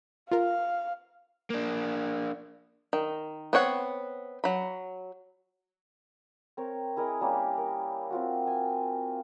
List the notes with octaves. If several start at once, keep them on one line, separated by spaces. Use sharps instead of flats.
F4 A#4 F5
A#3 D4
D#3
B3 C4 C#5 F#5
F#3 B5
C4 A#4 C#5
E4 G#4 A#4 D#5
G3 A#3 C#4 G4
A#4
C4 F4 F#4
G#5